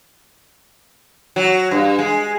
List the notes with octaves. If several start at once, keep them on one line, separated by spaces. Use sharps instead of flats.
F#3
G2
G#3